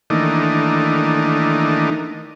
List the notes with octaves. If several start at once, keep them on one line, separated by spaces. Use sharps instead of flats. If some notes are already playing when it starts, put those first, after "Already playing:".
D#3 E3 A3 A#3 D4 D#4